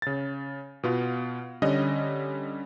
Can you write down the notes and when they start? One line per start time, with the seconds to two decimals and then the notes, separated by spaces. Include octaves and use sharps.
0.02 C#3 A6
0.83 B2 B3 F4
1.62 D3 G3 C#4 D#5